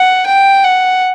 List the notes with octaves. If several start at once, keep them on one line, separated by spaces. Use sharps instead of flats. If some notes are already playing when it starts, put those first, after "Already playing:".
Already playing: F#5
G5
F#5